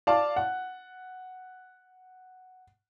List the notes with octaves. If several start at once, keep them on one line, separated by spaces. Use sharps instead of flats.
D5 F5 A5
F#5